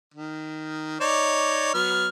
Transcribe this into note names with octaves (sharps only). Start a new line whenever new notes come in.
D#3
D#4 C#5 D5
F#3 B3 F6